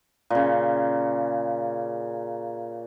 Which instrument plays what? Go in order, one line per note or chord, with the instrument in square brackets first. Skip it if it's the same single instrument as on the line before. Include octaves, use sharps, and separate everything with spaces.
[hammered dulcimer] A#2 C#3